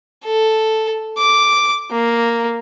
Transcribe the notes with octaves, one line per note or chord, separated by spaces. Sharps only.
A4
D6
A#3